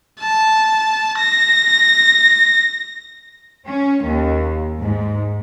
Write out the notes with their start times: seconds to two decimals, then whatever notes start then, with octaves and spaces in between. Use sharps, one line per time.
0.20 A5
1.18 A#6
3.67 C#4
4.05 D#2
4.79 G#2